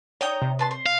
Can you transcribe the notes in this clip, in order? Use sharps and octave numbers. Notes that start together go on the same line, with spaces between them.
D#4 C#5 D5 G5 A#5 D#6
C3
B4 A5 C6
C5
F5